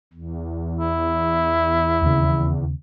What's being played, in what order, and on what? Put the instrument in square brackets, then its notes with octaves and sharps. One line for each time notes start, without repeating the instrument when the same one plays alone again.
[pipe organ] E2
[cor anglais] E4
[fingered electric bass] D#2 C#3